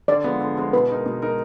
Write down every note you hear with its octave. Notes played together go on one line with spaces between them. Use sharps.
D3 D5
F3 G#3 B3
D3
F3 G#3 B3
B2 B4
G#3 D#4 A#4
B2
G#3 D#4 A#4